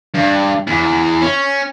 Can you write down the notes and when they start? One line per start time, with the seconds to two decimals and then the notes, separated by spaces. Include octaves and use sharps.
0.14 G2
0.67 E2
1.22 C#4